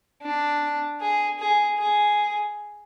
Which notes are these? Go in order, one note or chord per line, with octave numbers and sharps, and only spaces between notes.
D4
G#4
G#4
G#4